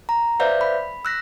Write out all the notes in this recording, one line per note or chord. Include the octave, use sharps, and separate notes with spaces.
A#5
B4 C5 D5 E5 F5 G6
B5
E6 F#6 A#6 B6